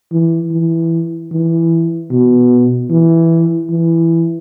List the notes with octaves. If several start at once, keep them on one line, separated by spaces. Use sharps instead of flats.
E3
E3
E3
B2
E3
E3